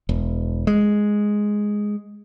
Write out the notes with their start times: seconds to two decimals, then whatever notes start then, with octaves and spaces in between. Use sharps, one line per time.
0.09 E1
0.67 G#3